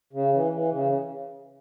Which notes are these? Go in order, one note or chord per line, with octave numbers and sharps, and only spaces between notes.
C#3
E3
E3
C#3